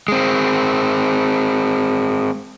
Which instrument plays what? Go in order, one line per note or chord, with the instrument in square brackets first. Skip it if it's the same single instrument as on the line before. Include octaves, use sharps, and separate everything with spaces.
[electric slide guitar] G#3 C4